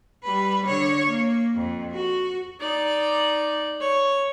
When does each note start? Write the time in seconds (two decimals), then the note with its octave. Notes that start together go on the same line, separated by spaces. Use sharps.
0.24 G3 B4
0.66 D3 C#5
1.08 A#3
1.56 F2
1.92 F#4
2.60 D#4 D5
3.81 C#5